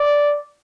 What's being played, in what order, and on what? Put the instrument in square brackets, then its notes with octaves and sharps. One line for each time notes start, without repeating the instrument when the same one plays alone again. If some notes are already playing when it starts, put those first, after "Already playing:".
Already playing: [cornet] D5